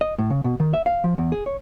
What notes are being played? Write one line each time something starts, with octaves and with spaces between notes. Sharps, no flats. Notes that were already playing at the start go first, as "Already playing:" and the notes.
D#5
A2
C#3
B2
D#3
E5
F5
F3
E2
G#4
C#5